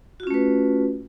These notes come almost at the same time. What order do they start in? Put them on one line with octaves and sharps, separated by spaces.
F#4 F4 C#4 A3 B4